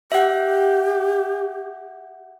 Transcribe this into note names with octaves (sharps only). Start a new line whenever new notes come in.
G4 E5 F#5